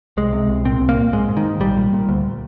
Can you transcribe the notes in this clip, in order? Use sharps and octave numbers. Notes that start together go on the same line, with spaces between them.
C2 G#3
C3
C2
A#2 C4
C2
A#3
A#2
G#2 G#3
G#2
D#3
G#2
A#1 G3
A#2
A#2
D2